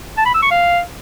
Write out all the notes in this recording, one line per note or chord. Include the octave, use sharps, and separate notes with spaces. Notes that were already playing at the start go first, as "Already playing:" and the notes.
A5
B5
E6
C#6
F5